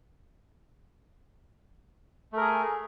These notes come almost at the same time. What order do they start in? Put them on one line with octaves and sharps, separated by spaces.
A3 A#4 G#4